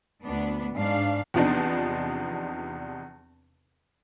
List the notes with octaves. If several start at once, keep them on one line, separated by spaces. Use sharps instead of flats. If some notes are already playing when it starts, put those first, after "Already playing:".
D2 B3 D4
G#2 D4 F5
E2 C3 F3 B3 D4 D#4